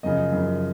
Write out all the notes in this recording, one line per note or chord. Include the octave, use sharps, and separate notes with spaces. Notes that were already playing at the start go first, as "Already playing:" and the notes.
F#2 C#3 F3 D#5
F#2 C#3 F3